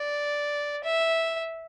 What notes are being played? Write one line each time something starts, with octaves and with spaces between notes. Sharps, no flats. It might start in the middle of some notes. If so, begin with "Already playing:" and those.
Already playing: D5
E5